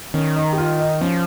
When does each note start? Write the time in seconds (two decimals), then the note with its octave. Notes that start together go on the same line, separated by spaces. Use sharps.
0.14 D#3 C#4
0.36 D#4
0.53 G4
0.58 F4
0.80 D#4
1.01 F3 C#4